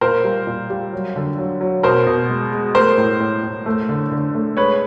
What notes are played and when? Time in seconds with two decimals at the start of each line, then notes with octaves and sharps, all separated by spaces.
0.01 A#2 A#4 C5
0.24 G3
0.47 A#2
0.70 G3
0.93 F#3
1.16 D3
1.38 F#3
1.61 F#3
1.83 B2 A#4 C5
2.07 B2
2.30 G#3
2.52 G#3
2.75 A3 A#4 C5
2.98 A2
3.20 A2
3.43 A2
3.66 A3
3.89 D3
4.12 D3
4.35 A3
4.57 G#3 B4 C#5